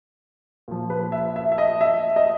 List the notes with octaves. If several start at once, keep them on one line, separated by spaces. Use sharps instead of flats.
A#2 F3
B4
E5
E5
E5
D#5
E5
D#5